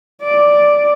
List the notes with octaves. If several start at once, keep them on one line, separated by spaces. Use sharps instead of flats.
D5